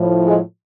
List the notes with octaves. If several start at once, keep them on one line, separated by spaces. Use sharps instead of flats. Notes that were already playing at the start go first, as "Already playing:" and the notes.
Already playing: A2 F3
G#3